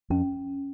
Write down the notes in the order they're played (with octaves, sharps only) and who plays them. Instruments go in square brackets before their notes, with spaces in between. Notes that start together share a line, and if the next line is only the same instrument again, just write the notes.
[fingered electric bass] F2 [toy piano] C#4